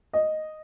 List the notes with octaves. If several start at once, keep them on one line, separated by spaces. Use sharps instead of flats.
D#5